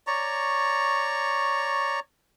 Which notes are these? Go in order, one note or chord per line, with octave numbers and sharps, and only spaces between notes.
C#5 D5 A#5 C#6